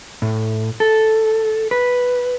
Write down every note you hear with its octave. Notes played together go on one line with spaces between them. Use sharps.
A2
A4
B4